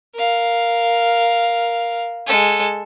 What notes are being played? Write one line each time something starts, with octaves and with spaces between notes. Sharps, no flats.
A#4 F5
G#3 A4